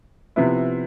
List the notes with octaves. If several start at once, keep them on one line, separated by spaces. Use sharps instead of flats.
C3 F3 B3 E4